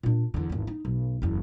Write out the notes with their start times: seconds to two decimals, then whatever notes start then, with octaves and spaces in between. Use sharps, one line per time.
0.03 A#2 D4
0.34 E2 D3
0.49 G#1 E2
0.67 D#4
0.85 B1
1.22 F#1 E2